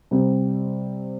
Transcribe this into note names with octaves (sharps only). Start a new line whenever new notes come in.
C3 G3 C4